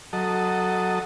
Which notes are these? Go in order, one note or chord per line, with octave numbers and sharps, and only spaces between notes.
F#3 A4 D#5